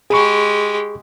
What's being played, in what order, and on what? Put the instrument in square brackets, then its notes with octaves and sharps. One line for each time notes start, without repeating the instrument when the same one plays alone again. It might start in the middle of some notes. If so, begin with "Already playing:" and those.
[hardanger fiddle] G#3 G4 [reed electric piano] G#4 B5 C#6